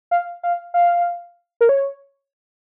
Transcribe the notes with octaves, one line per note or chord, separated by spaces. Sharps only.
F5
F5
F5
A#4
C#5